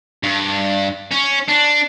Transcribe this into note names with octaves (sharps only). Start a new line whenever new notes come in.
G2
C#4
D4